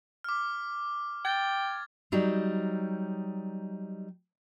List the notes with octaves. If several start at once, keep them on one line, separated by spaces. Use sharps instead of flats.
D6 F6
G5 G#6 A6
F#3 G3 D#4